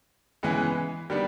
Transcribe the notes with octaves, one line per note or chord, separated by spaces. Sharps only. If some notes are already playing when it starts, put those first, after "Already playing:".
C#3 E3 G#3 B3
D#3 G3 B3 D4